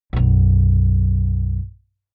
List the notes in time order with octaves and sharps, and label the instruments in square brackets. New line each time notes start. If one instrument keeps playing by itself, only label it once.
[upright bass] B1 F#2